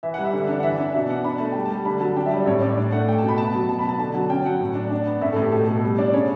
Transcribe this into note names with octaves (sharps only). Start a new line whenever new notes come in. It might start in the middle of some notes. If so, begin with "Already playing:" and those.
E3 E5
G3 F#5
E5
D3
D4
F#5
E3 E5
D4
B2 E5
B2 F#5
D4 B5
A3 A5
G3 G5
A5
G3
D3 B5
F#3 A5
D4 G5
E5
G3 D5
A2 C#5
A2 D5
D4
A3 F#5
A3 G5
B2 A5
B5
B3 A5
F#3
B2 A5
B5
B2 A5
D3 A5
F#3 A5
C#4 G5
F#3 F#5
A2
D4
D4
B3
A2 E5
A2 A4
G4
B2 A4
B2 A4
G3
D4 D5
C#3 C#5